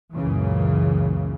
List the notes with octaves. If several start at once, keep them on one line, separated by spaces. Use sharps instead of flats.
C#2 F#2 A#2 C#3 E3